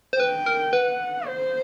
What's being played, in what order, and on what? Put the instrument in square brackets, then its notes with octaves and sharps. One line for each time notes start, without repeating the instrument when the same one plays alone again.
[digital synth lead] C5
[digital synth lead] B4 [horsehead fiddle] G5
[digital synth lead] A#4
[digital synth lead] B4 [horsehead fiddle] F#5
[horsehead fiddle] C5